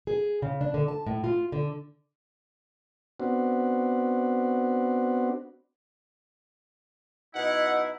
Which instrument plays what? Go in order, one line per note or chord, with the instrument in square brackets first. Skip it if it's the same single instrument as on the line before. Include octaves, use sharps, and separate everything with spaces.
[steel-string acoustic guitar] G#4
C#3
D4
D3
A5
A2
F4
D3
[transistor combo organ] B3 C4 D4 F#4
[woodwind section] B2 D#4 E4 [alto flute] D#5 [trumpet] F#5